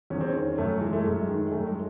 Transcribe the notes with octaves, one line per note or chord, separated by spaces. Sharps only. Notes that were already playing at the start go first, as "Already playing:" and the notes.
E2 C#4
C4
C#4
D#3
F#2 A3
E3 G#3
A3
F#2 G#3
D#3
F#2 A3
G#3